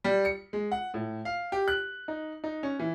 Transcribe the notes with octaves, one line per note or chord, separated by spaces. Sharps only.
G3
C#7
G#3
F#5
A2
F5
G4
F#6
D#4
D#4
C#4
E3